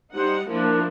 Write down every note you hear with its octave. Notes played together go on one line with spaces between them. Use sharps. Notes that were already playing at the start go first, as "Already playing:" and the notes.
G3 D#4 C5 F#5
F3 A#3 D4 E4